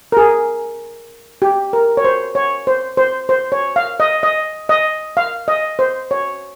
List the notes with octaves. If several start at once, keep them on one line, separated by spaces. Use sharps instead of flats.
A#4
G#4
G4
A#4
C#5
C5
C#5
C5
C5
C5
C#5
F5
D#5
D#5
D#5
F5
D#5
C5
C#5